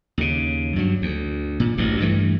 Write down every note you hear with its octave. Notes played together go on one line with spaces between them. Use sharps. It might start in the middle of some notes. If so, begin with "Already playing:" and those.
D#2 C#3
G2 F#3
D2
A#2
A1 D2 G2
G2 E3 A3